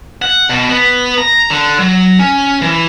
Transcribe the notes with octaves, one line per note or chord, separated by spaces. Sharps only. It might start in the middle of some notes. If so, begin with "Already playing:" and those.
F#5
B2
B3
A#5
D3
F#3
C#4
E3